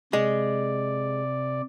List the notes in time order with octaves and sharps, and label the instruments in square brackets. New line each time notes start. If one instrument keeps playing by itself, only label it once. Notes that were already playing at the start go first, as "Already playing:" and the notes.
[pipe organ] C3 D5 [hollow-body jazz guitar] G#3